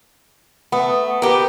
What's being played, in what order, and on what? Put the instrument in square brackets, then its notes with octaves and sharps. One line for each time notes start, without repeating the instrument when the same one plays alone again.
[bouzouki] A3 [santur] B3
[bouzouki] B3 G4 [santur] A#4 B4